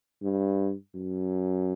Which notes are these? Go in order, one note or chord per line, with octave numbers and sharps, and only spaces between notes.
G2
F#2